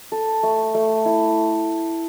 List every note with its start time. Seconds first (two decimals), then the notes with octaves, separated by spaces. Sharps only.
0.12 A4
0.43 A3
0.75 A3
1.05 E4